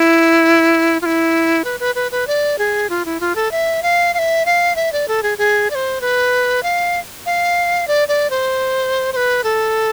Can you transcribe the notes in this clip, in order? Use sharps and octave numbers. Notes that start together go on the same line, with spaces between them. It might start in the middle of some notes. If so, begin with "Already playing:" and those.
Already playing: E4
F4
E4
B4
B4
B4
B4
D5
G#4
F4
E4
F4
A4
E5
F5
F5
E5
F5
E5
D5
A4
G#4
G#4
D5
C5
B4
F5
F5
D5
D5
C5
C5
B4
A4